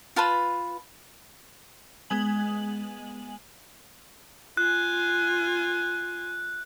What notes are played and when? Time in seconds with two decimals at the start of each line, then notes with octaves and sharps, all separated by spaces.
0.16 F4 B4 A5 B5
2.10 G#3 B3 G#5 F#7
4.57 F4 G#5 F#6